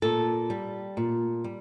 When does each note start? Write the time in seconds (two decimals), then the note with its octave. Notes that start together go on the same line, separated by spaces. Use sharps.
0.02 A#2 A4
0.50 G3
0.97 A#2
1.44 G3